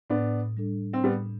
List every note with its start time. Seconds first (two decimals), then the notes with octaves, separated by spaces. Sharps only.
0.10 A2 B3 D4
0.57 G3 D4 A4
0.93 C4
1.04 A2 G3 B3